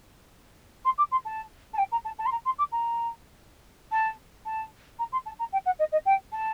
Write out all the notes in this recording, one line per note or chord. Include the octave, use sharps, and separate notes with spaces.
C6
D6
C6
A5
A5
G5
A#5
A5
A5
C6
A#5
C6
D6
A#5
A5
A5
A#5
C6
A5
A#5
G5
F#5
D#5
D#5
G5
A5